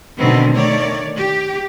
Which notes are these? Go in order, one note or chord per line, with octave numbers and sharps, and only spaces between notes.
B2 D3 D#3 A3 B3 C4
D#3 A3 C#5 D5
G4